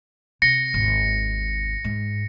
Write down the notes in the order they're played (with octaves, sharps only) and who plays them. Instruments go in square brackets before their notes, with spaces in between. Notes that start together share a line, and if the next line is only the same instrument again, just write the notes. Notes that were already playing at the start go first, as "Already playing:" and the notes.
[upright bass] C3 [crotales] A#6 C#7
[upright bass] G#1 D#2
G#2